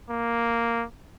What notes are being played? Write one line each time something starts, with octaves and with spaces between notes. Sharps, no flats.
A#3